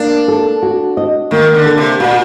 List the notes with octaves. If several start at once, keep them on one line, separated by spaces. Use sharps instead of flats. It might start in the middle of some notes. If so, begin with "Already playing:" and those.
Already playing: A#3 D4
A4
F#4
D#5
D#3 A#3
D3
A4
C3
A#2 F#4